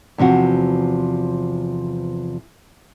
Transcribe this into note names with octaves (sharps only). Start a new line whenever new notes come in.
E2 C3 F3 F#4